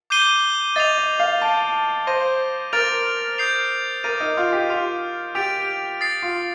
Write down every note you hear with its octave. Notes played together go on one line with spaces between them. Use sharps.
D6 G6 C7 D#7 G7
D#5 A6 C7 F7
D#5
F5
A5 G6 D7 F7
C5 D#6 A#6 D#7 G7
A#4 D6 F6 A6 D7 F7
D#6 G6 C7 F7
A#4 D6 A6 D#7
D#4
F4
G4
F4 F6 C7 F7
G4 A6 D7 F7
D#6 A6 C7
F4